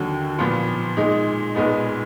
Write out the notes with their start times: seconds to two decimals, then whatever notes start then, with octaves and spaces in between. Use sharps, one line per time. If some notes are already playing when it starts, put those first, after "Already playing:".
Already playing: D#2 D3 F#3
0.39 A#2 F3 B3 F4
0.97 A#2 G#3 D#4
1.55 B1 A#2 G#3 B3 D#4